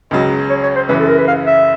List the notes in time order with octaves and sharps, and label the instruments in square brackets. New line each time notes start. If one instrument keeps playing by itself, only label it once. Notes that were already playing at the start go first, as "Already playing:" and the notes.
[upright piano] C#2 C#3 F#3 [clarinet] D#5
[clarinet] C#5
C#5
C5
[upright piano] F#2 C#3 E3 [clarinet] B4
[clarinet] A4
A#4
B4
F5
E5